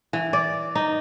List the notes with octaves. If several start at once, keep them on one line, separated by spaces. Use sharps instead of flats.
E3
D5
D#4